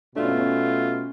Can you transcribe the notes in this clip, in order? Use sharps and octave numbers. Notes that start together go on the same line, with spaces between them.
B2 A3 D4 F4
C#4
B3
C#4